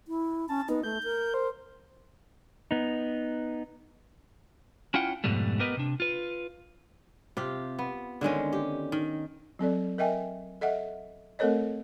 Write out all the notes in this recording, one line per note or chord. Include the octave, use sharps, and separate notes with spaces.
E4
C#4 A5
B3 D#4
A3 G6
A#4
C5
B3 D#4
C#4 E4 F4 F#5 G5
F2 G#2 B2 G3 A3
B3 G4 A#4 B4 D#5
C3 D4
F4 B4
C3 F4 G4
B3
D3 D#3 G#3 C#4
G4
D#3
F#3 C4 A4 D5
A#4 D#5 E5 G5 G#5
A4 D#5 E5 F#5
A3 C4 A4 A#4 C#5 D#5